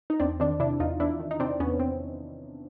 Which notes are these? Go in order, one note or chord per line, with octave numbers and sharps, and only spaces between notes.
D#4
E2 C4 D4
D#3 C4 D4
C3 D4 E4
E2 D#4 F4
E2 D4 E4
D#3
D#4
C3 C4 D4
E2 B3 C#4
C4